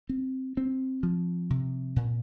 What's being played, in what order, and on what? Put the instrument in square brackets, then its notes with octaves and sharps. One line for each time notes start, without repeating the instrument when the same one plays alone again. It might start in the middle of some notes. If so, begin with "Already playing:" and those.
[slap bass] C4
C4
F3
C3
A#2